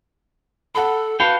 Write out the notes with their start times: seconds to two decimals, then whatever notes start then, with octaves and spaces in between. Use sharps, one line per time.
0.75 A4 F#5 A5 B5
1.20 F#4 B4 F5 G5 A5 B5